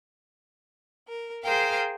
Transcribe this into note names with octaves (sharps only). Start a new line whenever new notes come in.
A#4
G#4 A#4 C5 F5 G5